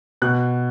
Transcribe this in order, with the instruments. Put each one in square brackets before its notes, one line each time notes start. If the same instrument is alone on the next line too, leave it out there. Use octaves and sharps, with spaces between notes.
[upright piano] B2 F#6